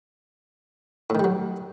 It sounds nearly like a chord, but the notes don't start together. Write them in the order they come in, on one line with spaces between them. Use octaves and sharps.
A2 D#3 G3 F#3